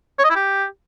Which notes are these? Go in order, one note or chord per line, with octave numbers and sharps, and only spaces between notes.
C#5
D#5
E4
G4